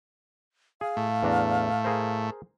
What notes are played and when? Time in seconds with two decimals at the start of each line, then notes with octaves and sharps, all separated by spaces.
0.81 G#4 F5
0.97 A2 A3
1.23 E2 D4 A#5
1.84 G#4 A#4 C5